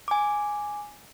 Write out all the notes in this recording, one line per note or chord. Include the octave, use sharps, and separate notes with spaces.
G#5 D6